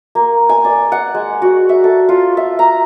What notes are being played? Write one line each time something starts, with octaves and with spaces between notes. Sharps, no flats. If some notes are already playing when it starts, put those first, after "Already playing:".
A#3
G#5
D5
F#5
G#3
F#4
E5
A4
F4
E5
A#5